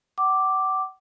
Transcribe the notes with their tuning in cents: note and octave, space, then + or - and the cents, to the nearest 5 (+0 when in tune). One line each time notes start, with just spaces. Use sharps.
F#5 +35 D6 +0